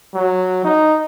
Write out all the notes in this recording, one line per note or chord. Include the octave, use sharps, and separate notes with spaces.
F#3
D#4